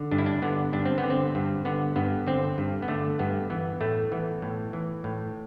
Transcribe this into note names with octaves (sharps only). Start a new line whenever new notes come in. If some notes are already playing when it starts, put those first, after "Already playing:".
Already playing: D3
G2 D4
E4
D4
D3 B3
G2 D4
C4
B3
D3
C4
G2
D3 B3
G2 B3
D3 C4
G2
B3
D3 A3
G2 B3
E3 B3
A2 A3
E3 B3
A2
E3
A2